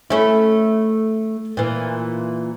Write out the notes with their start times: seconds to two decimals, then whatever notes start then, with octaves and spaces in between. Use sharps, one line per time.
0.10 A3 C#4 E4
1.57 A#2 E3